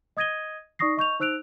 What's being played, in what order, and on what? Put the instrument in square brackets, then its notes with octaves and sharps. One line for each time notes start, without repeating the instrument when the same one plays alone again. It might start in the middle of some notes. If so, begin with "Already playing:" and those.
[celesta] D#5 D#6 G#6 A#6 D#7 G7
D#4 D5 C#6 D#6 A#6 C7
D#5 C#6 G6 F7
D#4 C5 E6 F#6 D7 F7